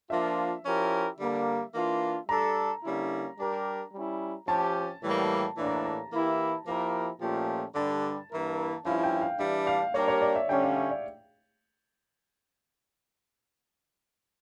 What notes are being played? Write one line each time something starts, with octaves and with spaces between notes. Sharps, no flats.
F3 A#3 D4 F4 E5
F3 C#4 E4 G4 A#4
D3 G3 A#3
E3 A#3 D4 F4
G3 D4 A4 A#5
D3 G3 A#3 C#4 E4
G3 D4 G4 A#4
G3 C#4 E4
F3 C#4 G4 A5
A2 E3 G3 A#3
A2 E3 A#3 D4
A#5
A5
A#5
E3 A#3 E4 G4
F3 A#3 E4 G4 A#4
A#2 F3 A3 C#4 G4
G2 D3 G3 D4 A5
G2 E3 A#3 E4 A#4
G2 F3 C#4 E4 F5
G5
F5
E3 G3 D4 E5
F5
G3 A#3 D4 G4 A#4 C#5
C#5
D5
E5
D3 G3 C#4 G5
F5
E5
D5